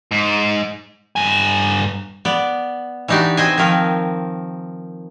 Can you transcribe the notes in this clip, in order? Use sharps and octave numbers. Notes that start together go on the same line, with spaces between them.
G#2
G2 G#5
B3 D5
E3 D4 D#4 F#4 G4
C4 C5 D#5 G#5
D#3 F3 C4 A#4